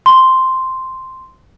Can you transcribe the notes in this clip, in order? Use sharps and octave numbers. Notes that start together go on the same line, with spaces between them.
C6